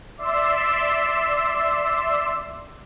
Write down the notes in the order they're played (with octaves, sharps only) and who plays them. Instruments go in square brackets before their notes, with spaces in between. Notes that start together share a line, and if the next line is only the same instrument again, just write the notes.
[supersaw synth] D5 E5 C6 E6